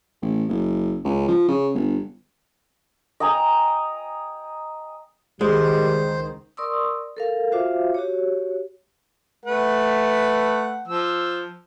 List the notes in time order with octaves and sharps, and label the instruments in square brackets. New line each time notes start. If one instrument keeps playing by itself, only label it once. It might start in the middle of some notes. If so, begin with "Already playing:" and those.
[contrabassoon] A1
F#1
C#2
F3
C#3
G1
[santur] D#5 G5 G#5 A#5
[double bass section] C#2 D#3 [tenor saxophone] G3 [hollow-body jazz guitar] G#3 [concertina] C5
[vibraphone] A#4 D5 C6 C#6 D#6 E6
A4 A#4 F5
F4 F#4 C5 E5 F5 D6
F#4 G4 C#5
[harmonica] A3 B4 F#5
F3 E6